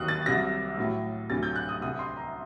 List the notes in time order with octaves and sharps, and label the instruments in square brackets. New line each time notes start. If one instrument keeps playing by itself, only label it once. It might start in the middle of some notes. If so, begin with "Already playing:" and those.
Already playing: [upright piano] D#2 D#3 F#3 D#6 F#6
A6
C2 C3 F#3 A#6
A2 F#3
D2 C3 F#3 A6
G6
F#6
D#6
C2 C3 G3 D#6
C6
A#5